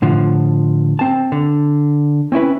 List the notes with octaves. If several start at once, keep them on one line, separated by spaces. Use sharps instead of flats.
A2 D3 F3
C4 A5
D3
C4 C#4 E4 B4